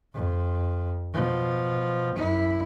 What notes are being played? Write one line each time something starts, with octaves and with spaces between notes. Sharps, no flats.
F2
B2 F3
F#2 E4